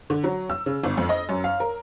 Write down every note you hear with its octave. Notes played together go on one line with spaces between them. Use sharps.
D3
F#3
E6
C#3
G1
F2
D#5
F#2
F5
A#4